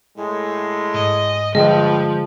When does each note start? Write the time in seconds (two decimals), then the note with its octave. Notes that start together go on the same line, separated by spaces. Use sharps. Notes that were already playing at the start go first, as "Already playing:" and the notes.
0.17 A2 G#3
0.94 G#2 D#5
1.55 G2 D3 F3 G#3 G#4 D#5